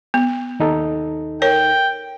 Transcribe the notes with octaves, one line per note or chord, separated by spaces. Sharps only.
B3
D#2 D#4 A4
A#4 C#5 G5